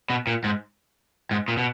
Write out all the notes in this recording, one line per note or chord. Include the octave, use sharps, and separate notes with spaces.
B2
A#2
G#2
G#2
A#2
B2